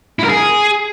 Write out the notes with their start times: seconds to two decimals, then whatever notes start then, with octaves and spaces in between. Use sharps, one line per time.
0.19 E4
0.24 A#4
0.29 G#4